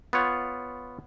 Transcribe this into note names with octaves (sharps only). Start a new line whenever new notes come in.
B3 F4 C#5 F#5